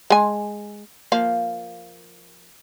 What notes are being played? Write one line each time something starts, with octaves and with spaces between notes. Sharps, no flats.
G#3 G#5
F3 A#3 F5